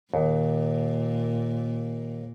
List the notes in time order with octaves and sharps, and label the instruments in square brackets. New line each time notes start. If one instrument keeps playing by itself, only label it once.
[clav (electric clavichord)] D#2 [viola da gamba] A#2